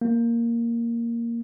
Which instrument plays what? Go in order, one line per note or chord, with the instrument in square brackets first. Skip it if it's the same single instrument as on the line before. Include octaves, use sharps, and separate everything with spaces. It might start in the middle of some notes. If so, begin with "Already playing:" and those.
[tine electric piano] A#3